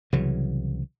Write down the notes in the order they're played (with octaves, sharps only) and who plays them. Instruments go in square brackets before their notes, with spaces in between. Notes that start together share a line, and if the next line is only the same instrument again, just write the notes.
[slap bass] C2 C#3 E3 F#3